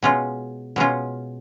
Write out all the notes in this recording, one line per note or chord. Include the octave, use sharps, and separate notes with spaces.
B2 G#3 C#4 F4
B2 G#3 C#4 F4